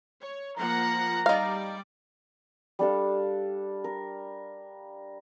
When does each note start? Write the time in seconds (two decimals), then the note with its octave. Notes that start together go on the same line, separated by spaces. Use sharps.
0.22 C#5
0.58 F3 A#3 F#5 A#5
1.26 G3 D#4 D5 F5
2.79 G3 D4 A4 F5
3.84 A#4